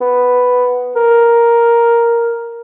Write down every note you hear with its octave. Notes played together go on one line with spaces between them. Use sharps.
B3
A#4